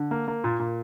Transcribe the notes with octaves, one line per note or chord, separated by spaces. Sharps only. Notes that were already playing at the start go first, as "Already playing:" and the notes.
Already playing: D3
A#3
A#3
A#2
A#2